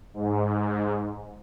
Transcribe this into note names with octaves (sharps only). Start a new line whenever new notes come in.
G#2